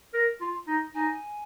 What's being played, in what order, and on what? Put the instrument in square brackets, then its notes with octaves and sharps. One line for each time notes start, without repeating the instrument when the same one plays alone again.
[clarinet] A#4
F4
D#4
[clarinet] D#4 [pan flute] G#5